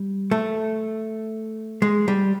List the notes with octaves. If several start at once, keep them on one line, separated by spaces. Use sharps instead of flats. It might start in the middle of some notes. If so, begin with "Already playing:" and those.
Already playing: G3
A3
G#3
G3